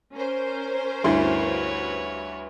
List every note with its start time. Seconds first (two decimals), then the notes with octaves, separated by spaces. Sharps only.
0.14 C#4 A#4 C5
1.04 D2 G2 E4 F#4 B4 C#5 E5 C6